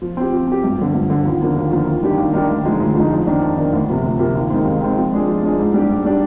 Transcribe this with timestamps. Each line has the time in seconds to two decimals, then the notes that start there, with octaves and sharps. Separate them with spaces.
0.02 F3
0.17 C4 G4
0.33 F3
0.48 C4 G4
0.64 G2
0.79 D3 F3
0.95 G2
1.10 D3 F3
1.25 D#2
1.41 D3 F3 A#3
1.56 D#2
1.72 D3 F3 A#3
1.87 D#2
2.03 D#3 G3 D4 G4
2.18 D#2
2.33 D#3 G3 D4 G4
2.49 D2
2.65 D3 F3 G#3 D#4
2.80 D2
2.95 D3 F3 G#3 D#4
3.11 F2
3.27 D#3 A#3 D4
3.42 F2
3.57 D#3 A#3 D4
3.73 D2
3.89 C3 F3 A#3
4.03 D2
4.19 C3 F3 A#3
4.35 D#2
4.50 D#3 G#3 C4
4.65 D#2
4.81 D#3 G#3 C4
4.97 F3
5.12 G#3 D4 G#4
5.28 F3
5.43 G#3 D4 G#4
5.59 G#2
5.74 G3 D4 G4
5.89 G#2
6.05 G3 D4 G4